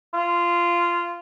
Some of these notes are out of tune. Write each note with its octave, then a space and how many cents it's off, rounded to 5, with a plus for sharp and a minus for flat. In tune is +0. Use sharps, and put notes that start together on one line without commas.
F4 -15